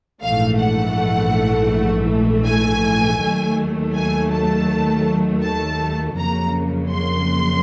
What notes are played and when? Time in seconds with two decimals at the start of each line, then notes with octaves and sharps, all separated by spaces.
0.23 A#1 G#2 E3 A3 F5
0.60 F#5
2.46 G#5
3.21 D#2 D#3 F#3 A3
3.95 G#5
4.32 A5
5.43 A5
6.17 F2 C#3 F#3 A#3 A#5
6.92 C6